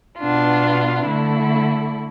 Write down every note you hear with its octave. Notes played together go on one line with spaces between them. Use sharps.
B2 B3 D4 F4
D3 A3 E4